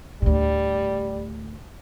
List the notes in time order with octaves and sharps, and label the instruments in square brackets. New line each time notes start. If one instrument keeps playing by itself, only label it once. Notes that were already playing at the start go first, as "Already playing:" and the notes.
[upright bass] D2 A2 [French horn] G3